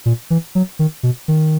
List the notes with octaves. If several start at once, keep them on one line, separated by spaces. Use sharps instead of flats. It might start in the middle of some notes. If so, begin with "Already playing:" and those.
A#2
E3
F#3
D#3
B2
D#3